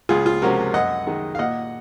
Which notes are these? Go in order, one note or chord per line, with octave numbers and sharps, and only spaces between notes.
C#2 F4 G#4
F4
C3 F3 G#3 C#4 F#4 A#4
F#2 D#5 F#5
D#3 G#3
F5
A#2 D#5 F#5